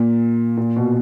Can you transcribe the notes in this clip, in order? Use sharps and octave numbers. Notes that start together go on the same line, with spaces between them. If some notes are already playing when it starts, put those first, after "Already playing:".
Already playing: A#2
A#2
B2